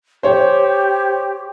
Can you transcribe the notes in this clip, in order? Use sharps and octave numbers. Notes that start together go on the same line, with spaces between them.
G4 C5 C#5